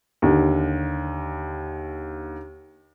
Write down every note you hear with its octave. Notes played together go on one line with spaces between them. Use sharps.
D#2 D3